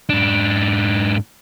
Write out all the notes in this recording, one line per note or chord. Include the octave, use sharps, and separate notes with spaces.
G#2 D4